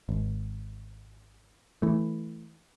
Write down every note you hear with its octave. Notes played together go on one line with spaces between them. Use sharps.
G#1
E3 A3